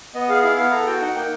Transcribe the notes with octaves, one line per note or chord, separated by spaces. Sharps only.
B3 D#5
G#4 F5
E4 F5
B3 F5
A4 A#5
F#4 G5
D#4 F#5
A#3 G5